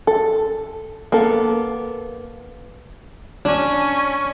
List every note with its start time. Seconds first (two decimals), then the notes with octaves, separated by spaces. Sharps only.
0.07 A4
1.12 A#3 B3 A4
3.45 C#4 D4